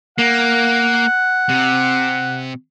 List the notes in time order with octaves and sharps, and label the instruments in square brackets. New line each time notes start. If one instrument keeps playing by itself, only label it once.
[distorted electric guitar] A#3 [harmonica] F#5
[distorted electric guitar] C3